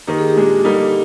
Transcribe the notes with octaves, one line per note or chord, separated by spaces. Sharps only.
D#3 A#3 D#4 G4
G#4
G4
A#2 G#3 D4
D3 G3 A#3 D#4